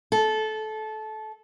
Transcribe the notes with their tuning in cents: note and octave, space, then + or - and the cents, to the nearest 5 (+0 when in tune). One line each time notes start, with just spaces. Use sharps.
A4 -20